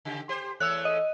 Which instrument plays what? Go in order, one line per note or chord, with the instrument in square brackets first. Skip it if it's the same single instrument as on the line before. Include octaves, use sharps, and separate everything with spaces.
[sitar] C#3 G4
G4 C5
[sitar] E2 A3 C#5 [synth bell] E6 F#6
[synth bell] D#5